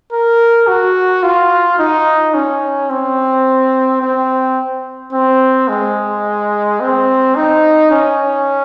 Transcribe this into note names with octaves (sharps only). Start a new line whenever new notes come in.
A#4
F#4
F4
D#4
C#4
C4
C4
C4
G#3
C4
D#4
C#4